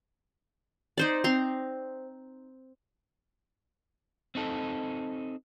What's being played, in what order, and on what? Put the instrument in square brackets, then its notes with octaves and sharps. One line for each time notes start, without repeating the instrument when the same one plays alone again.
[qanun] D#4 C5 D5
C4 A#5 C6
[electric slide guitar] C4 D#4 A4